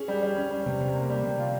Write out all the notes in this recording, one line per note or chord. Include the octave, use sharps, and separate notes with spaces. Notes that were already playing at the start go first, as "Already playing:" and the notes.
Already playing: C#4 G#4
G3
G3
C#4
G3
C3
C3
A#3
G3
C3
F4